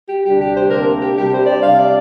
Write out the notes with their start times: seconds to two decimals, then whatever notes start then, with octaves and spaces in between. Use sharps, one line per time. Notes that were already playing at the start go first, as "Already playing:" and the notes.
0.08 G4
0.24 D2 C3 G3 D4 G4
0.39 G4
0.55 C5
0.71 C3 A#3 D4 A#4
1.01 G4
1.17 C3 G3 D4 G4
1.32 C5
1.47 D5
1.62 C3 G3 D4 F5
1.78 D5